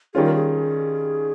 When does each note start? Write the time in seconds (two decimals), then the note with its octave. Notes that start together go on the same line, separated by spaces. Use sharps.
0.14 D#3 G3 C#4 F4 G#4
0.24 A#4
0.34 G#4